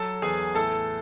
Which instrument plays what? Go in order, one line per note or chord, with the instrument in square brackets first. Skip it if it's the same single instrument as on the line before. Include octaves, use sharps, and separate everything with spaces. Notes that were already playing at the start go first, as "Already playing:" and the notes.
Already playing: [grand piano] F#3 A4 A5
E2 G#4 G#5
A2 A4 A5